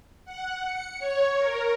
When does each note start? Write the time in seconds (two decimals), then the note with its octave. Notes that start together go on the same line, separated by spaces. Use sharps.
0.25 F#5
0.67 C#7
0.99 C#5
1.37 A#4